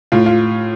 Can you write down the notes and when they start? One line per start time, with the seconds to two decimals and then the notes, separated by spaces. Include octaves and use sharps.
0.12 A2 F4
0.26 F4